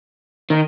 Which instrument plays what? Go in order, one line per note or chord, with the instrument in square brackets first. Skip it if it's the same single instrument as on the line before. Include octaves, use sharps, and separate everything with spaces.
[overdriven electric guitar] D#3